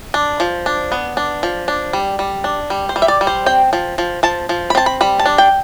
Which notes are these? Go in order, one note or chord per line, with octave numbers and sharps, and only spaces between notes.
D4
F3
D4
B3
D4
F3
D4
G3
G3
D4
G3
C5
G3
E5
D5
G3
C5
C4 G5
F3
F3
F3 A5
F3
B5
C4 A5
B5
G3 B5
A5
D4
G5